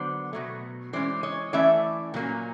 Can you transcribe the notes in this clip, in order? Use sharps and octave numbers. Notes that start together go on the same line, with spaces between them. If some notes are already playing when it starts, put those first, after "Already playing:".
Already playing: D3 F#3 B3 C5 D5
B2 F#3 A3
E3 G#3 C#4 C5 D5
C#5 D#5
E3 A3 C#4 D5 E5
A#2 F#3 A#3 C#4